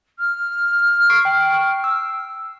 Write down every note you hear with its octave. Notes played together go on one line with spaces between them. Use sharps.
F6
C#6 C7 D7
G5
E6